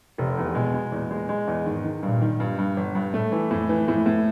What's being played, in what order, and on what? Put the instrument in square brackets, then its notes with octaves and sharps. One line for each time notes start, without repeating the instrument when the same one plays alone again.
[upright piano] F1 [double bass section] C3
[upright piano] E2
[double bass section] B2 [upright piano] G#3
[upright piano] G#3
[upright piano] E2 [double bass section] A#2
[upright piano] G#3
G#3
E2
[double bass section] G#2 [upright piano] D#3
[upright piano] D#3
[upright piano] G2 [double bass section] A#2
[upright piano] D#3
G2
G2
G1
G2
[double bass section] A2 [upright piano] A3
[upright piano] E3
[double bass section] F2 [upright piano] A2
[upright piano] E3
[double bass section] F2 [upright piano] A2
[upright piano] A2